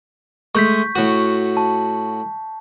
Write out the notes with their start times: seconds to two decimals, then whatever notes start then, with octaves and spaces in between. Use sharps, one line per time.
0.55 G#3 A3 C#6 G6 B6
0.95 A2 F#4
1.57 A5